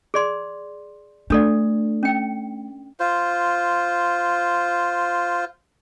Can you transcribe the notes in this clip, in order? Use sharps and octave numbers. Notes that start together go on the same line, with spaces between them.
G#4 D5 C6
A3 D4 A4 D5
C#4 G5
F4 C5